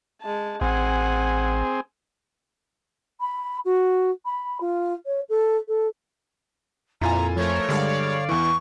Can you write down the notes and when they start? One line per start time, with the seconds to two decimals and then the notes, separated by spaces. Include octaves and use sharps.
0.22 G#3 A5
0.61 A1 C4 G#4 F#5 G#5
3.20 B5
3.65 F#4
4.25 B5
4.60 F4
5.06 C#5
5.29 A4
5.68 A4
7.01 F2 A#2 E4 F4 G#5 A#5
7.36 F3 A3 A#4 C#5
7.69 G2 D3 G3 G#3 D5 F5
8.29 E2 E3 C#6